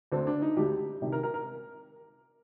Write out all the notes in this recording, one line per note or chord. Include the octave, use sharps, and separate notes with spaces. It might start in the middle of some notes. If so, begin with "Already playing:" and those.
D2 D3 C4
D4
D#4
D2 D3 G4
C2 C3 D#3
A#4
A#4
A#4